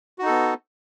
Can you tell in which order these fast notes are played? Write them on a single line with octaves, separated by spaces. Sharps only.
F#4 D#4 A4 B3